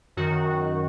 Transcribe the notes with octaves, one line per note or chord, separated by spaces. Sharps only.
F#2 D#3 F#4